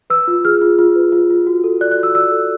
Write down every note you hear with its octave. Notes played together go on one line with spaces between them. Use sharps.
B4 E6
F4
G#4 F6
F4
F4
B4
F4
F4
F#4
A4
D5 F#6
F#6
F#4
E6
D5 E6
A4